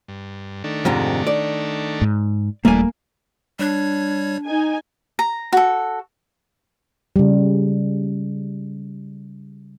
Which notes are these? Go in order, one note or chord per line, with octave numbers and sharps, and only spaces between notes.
G2
D#3 A3 D4
F2 G#2 C3
D5
G#2
D#1 E3 G3 A3 A#3 D4 G#5
G3 D4 C#5 G#6
D#4 G#5
A#5
F#4 A4
C#3 G3